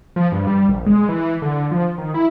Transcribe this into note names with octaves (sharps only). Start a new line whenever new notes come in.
F3
G2
G3
A#1
G#3
E3
D3
F3
D#3
E4